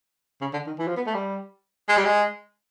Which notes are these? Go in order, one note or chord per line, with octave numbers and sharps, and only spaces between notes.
C#3
D3
D#3
E3
F3
B3
A3
G3
G#3
G3
G#3